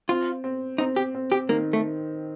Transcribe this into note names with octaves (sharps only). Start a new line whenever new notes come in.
C4 F4
C4
C4 D#4
G4
C4
G4
D#3 A#3
A3